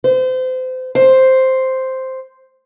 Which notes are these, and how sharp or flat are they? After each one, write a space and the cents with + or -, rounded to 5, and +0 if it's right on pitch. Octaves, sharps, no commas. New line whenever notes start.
C5 -30
C5 +0